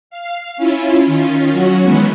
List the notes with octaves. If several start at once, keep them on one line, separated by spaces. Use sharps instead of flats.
F5
C#4 E4 F4
D#3 C#4 F4
F#3 C#4 F#4
D#3 E3 G#3 B3 C#4